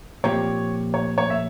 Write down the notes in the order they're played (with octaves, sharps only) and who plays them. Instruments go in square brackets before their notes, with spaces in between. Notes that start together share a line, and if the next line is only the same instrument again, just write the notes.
[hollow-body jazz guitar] A#2 F3 C4 G4 [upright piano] C#5
[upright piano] C#5
C#5
E5